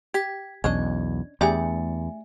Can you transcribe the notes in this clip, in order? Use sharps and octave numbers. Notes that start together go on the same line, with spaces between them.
G4 G#6 B6
B1 E2 C#4 D4 D#5 G#6
E2 A3 D4 G4 G#4 E5 G#5